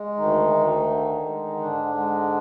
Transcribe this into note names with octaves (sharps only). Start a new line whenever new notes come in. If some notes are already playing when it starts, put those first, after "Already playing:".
Already playing: G#3
D2 D#3 D#4
D2
D3
G#3
G#2 D3 D4
G#3